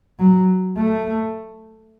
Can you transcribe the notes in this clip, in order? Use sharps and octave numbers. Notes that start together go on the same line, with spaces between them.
F#3
A3